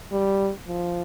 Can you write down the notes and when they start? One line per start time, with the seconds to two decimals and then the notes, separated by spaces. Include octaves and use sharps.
0.12 G3
0.68 F3